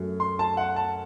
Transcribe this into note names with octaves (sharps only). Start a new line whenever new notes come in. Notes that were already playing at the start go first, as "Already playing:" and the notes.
Already playing: F#2 F#3 A3
C6
A5
F#5
A5